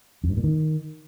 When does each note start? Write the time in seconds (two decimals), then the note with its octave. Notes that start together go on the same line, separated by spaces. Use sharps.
0.24 F2
0.30 G2
0.37 A#2
0.44 D#3